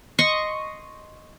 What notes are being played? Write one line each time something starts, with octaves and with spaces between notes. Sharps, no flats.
D#5 C6 C#6